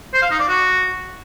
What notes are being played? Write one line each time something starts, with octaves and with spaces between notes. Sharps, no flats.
C5
F5
D#4
D5
F#4